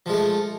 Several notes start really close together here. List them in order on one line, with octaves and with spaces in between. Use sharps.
F3 G#3 A3